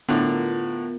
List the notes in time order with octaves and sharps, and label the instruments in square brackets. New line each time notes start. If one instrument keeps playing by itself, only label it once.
[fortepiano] A2 D3 [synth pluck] B3 F4 A#4